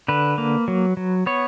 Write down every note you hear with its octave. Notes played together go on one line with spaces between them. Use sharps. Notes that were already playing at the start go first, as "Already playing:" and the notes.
D3 B4
A#3
F#3
F#3
B3 C#5